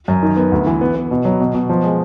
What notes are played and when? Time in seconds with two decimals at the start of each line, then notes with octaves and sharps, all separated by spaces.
0.08 F#2
0.23 D#3
0.37 B3
0.52 D2
0.67 E3
0.81 B3
0.95 B3
1.11 B2
1.25 F#3
1.40 B2
1.55 B2
1.69 F3
1.84 G#3